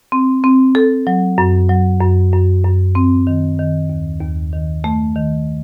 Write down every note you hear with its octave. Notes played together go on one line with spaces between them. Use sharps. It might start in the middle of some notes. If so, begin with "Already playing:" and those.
C4
C4
A4
F#3
F#2
F#3
F#2
F#2
F#2
C4
D#3
D#3
D#2
D#2
D#3
A3
D#3